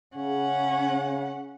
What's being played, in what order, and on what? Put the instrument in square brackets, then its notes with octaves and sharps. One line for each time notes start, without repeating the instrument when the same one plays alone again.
[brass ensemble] C#3 [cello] C#4 F#5